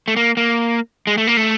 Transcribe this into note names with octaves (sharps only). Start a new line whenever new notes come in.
A3
A#3
A#3
G#3
A3
A#3
A3